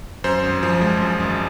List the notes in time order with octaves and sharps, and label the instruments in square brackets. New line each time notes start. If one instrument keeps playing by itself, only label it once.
[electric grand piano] F#2 C5
G#1
F3
G#3
F#2
G#1